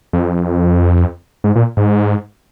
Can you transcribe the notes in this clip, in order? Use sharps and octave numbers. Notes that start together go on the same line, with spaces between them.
F2
G#2
A#2
G#2